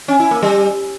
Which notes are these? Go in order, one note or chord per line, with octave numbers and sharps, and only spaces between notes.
C#4
E4
A#3
G3